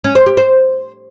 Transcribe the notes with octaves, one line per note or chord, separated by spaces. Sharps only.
C#4
C5
G4
C5